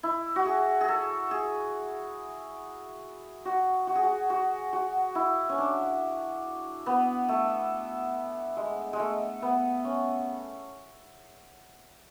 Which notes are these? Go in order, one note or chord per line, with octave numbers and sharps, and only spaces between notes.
E4
F#4
G#4
G#4
A4
G#4
F#4
F#4
G#4
F#4
F#4
F#4
E4
C#4
D4
B3
A3
G#3
G#3
A3
B3
C#4